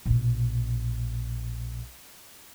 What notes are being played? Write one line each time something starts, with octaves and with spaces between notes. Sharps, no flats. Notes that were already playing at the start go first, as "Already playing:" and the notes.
A#1 B2